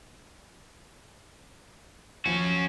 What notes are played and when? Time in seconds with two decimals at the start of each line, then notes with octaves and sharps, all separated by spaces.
2.26 D#2 F3 C#4 F#4